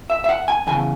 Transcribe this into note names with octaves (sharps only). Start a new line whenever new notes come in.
E5
E5
F#5
G#5
E2 C#3 G#5